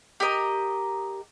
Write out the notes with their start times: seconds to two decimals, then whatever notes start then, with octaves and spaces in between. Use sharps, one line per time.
0.20 G4 A#4 D#5 A#5